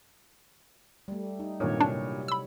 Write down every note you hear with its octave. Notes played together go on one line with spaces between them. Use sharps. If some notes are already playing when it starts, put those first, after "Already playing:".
G3 A3
D#4
G#1 G2 A#2 F#3 C#5
C3 D4 E4
B5 E6